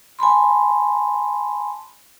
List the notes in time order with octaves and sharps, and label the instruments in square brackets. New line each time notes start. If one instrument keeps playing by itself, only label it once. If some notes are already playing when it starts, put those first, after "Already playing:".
[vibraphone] G#5 A5 B5 C6